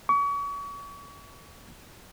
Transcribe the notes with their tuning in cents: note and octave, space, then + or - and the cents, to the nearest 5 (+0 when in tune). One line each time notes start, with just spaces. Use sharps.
C#6 +40